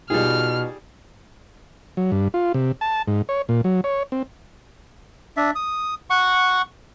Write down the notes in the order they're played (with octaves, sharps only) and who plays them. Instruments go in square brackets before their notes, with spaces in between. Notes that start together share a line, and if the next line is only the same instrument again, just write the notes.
[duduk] B2 [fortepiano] G3 G#4 [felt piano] D#4 F4 [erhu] F6
[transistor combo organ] F#3
G2
F4
C3
A5
G#2
C#5
A#2
F#3
C#5
C4
[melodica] D4 E5
D#6
F#5 C#6